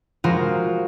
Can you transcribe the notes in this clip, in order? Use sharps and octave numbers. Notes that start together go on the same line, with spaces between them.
F3 G#3 F4 F#4 A#4